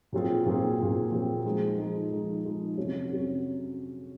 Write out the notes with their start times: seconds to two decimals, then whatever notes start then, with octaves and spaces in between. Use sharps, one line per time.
0.13 A#2 F#3 C4 F4 G#4
0.46 A#2 F#3 C4 F4 G#4
0.79 A#2 F#3 C4 F4 G#4
1.12 A#2 F#3 C4 F4 G#4
1.45 F3 G#3 D#4 G#4
1.78 F3 G#3 D#4 G#4
2.12 F3 G#3 D#4 G#4
2.45 F3 G#3 D#4 G#4
2.77 F2 C3 F#3 C#4
3.10 F2 C3 F#3 C#4